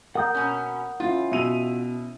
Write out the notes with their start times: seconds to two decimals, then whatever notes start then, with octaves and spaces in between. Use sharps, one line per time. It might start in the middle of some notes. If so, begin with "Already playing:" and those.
0.15 A#4 F#5 D#6 G6
0.35 B2 C#4
1.00 C#4 E4 F4
1.31 B2 E5 D#7 F7